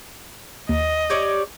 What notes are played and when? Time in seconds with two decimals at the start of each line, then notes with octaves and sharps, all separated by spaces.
0.69 D#2 D#5
1.10 G4 C#5 D5